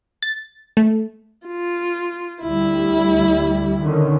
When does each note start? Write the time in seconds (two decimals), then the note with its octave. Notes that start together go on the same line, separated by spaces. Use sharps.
0.23 A6
0.77 A3
1.47 F4
2.42 D2 G3 E4
3.80 D3 D#3 C#4